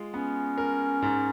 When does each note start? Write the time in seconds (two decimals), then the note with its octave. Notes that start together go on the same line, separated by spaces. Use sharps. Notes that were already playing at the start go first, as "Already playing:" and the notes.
Already playing: G#3 F4
0.13 B3 C#4
0.58 A#4
1.02 G#2